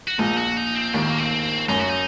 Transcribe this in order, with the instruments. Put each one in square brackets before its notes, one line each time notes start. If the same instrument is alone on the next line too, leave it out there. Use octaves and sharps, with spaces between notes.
[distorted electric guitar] F#4
[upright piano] A#1 A#2 [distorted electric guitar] D#4
[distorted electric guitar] F#4
D#4
C4
[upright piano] D#2 D#3 [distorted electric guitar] D4
[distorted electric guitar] C4
A#3
C4
[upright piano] F#2 [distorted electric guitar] D#4
[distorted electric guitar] F#4
D#4